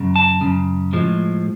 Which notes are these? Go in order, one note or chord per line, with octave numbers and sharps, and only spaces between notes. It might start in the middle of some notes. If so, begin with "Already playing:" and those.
Already playing: F#2 C#3
A5
F#2 C#3
A2 F3 G#3